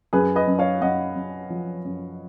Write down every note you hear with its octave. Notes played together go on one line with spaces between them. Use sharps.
F#2 G#4 B4
B4 D#5
F#2
C#5 F5
F#2 D#5 F#5
F#2
F3
F#2